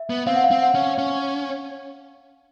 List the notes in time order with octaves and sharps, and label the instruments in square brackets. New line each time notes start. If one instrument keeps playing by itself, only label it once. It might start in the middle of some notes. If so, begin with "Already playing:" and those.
Already playing: [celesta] E5
[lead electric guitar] B3
[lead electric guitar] C4 [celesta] F5
[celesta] F#5
F5
[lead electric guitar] C4
[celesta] F#5
[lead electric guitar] C#4
C#4